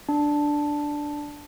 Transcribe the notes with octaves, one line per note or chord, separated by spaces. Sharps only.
D4